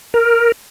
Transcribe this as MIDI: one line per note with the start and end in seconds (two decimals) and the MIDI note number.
0.14 0.52 70